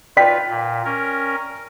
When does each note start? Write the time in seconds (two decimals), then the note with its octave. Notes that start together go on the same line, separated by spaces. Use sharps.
0.17 F4 B4 D5 G5 B6
0.49 A#2
0.85 C#4 A#4